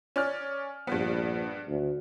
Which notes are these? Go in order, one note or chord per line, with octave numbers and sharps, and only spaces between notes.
C#4 D5 F6
A#1 G2 G3 B3
D2